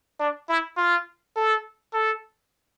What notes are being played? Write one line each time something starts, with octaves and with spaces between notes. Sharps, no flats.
D4
E4
F4
A4
A4